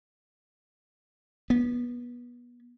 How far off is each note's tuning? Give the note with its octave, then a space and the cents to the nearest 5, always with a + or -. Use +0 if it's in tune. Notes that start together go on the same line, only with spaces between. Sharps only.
B3 -25